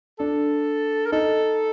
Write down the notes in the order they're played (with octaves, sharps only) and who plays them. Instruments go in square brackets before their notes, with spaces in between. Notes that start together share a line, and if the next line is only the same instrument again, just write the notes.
[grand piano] D4 [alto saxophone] A4
[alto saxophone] A#4
[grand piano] D#4 [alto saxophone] A4